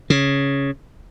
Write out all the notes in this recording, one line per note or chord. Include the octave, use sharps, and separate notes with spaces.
C#3